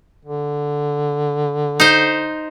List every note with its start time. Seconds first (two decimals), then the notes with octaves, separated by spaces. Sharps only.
0.25 D3
1.80 D#4 C5